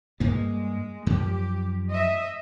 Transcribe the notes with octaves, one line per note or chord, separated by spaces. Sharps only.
G2 G#3 A#3
F#2 F3 G4
D#5 E5